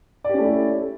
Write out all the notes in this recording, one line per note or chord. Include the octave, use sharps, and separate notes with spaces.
A3 C#4 E4 G4 D5